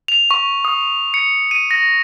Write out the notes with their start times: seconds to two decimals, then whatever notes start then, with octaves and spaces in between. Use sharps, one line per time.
0.08 F7
0.31 C#6
0.65 D#6
1.14 C#7
1.51 D#7
1.71 A#6